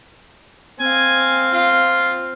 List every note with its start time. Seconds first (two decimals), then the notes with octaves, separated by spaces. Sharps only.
0.80 C4 F5 G#5
1.53 F4